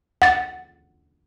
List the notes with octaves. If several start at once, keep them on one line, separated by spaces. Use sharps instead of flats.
F#5 A6